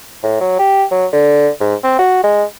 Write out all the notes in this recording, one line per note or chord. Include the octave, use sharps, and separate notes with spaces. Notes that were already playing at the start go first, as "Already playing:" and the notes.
A2
F#3
G4
F#3
D3
G#2
C4
F#4
G#3